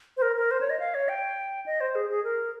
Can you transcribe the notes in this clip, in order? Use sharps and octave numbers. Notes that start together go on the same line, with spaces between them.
C5
A#4
A#4
C5
C#5
D#5
F5
C#5
G5
D#5
C5
G#4
G#4
A#4